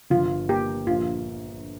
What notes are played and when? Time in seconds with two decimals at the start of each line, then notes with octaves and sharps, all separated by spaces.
0.10 G1 F4
0.49 A#3 G4
0.87 A#1 F4